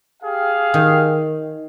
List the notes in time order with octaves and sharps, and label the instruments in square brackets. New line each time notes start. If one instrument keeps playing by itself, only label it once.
[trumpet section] G4 G#4 F5
[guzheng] D#3